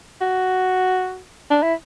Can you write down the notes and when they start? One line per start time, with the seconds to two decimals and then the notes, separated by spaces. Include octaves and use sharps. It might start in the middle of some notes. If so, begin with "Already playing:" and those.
0.21 F#4
1.50 D4
1.63 E4